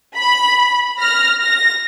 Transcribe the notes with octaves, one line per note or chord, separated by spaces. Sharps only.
B5
F6 A#6
A#6